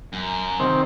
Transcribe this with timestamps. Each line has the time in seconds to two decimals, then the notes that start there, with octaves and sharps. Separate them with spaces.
0.13 F#2
0.60 C3 D#3 C4